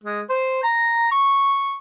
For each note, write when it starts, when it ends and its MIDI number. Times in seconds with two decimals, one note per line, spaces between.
0.04 0.21 56
0.30 0.60 72
0.63 1.08 82
1.12 1.77 85